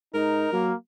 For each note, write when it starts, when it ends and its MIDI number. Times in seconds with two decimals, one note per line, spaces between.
0.14 0.47 44
0.14 0.52 63
0.14 0.69 70
0.53 0.72 54
0.53 0.74 58